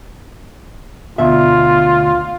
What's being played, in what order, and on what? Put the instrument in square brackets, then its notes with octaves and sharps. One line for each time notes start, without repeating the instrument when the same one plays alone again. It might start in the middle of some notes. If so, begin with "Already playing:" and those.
[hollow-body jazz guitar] D2 B2 E5 [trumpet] F4